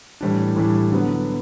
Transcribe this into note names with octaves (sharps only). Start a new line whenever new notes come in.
A2 E3 G3 D4
A2 E3 G3 D4
D3 F#3 B3